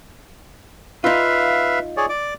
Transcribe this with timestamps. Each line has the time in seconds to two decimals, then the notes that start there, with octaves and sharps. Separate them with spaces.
1.04 D#4 F4 B4 E5 F5
1.97 G#4 C#5 D5
2.09 D5 D6